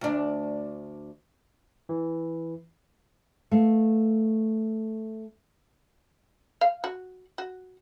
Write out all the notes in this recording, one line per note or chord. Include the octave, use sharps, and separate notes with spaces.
D2 D4
E3
A3 B3 A4 F5
F5
F#4
F#4